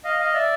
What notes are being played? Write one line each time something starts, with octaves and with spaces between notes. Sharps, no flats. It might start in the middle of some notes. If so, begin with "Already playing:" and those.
D#5 F5
D#5 F5
D5 E5